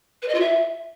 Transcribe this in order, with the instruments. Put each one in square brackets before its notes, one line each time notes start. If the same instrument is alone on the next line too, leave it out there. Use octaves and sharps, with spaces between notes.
[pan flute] B4
D#5
F4
E5